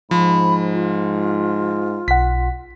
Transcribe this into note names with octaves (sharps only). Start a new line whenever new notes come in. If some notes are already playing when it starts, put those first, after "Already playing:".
G#2 F3 B5
F4
B1 F#5 B6